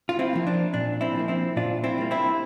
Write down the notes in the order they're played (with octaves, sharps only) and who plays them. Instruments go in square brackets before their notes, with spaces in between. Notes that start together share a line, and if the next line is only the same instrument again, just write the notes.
[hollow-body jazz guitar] F4
C4 E4
F3 A#3
D4
A#2 D4
C4 E4
F3 A#3
C4 E4
A#2 D4 F4
C4 E4
G3 A#3
C4 E4